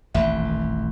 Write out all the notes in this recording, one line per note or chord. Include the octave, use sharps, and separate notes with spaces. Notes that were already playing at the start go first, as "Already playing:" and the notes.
D#1 A1 F2 E5 B5